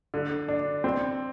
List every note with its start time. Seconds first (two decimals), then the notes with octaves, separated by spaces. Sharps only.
0.14 D3
0.48 D4
0.84 C4